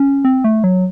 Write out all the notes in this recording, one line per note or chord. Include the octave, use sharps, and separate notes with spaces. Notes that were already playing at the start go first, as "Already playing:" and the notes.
Already playing: C#4
C4
A3
F#3